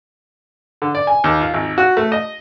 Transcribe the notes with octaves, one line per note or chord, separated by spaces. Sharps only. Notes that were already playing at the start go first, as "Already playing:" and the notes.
D3
D5
G#5
D#2
F4
G#1
F#4
A3
D#5